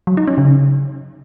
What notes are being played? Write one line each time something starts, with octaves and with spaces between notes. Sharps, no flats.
F#3
D#4
C#4
C#3